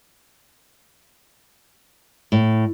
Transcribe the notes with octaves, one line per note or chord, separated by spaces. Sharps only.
A2